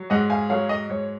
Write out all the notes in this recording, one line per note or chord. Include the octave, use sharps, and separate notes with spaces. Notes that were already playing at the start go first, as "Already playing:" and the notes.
Already playing: F#3
G#2 D#5 F#5
F5 G#5
F#3 C#5 F5
D#5
G#2 C#5